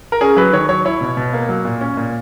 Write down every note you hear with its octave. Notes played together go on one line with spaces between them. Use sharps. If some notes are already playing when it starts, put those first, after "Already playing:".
A#4
C#4 G#4
F#3 B4
D#3 C#5
F#3 C#5
E4 C#5
B2
B2
A#3
F#3
A#2
C#4
A#2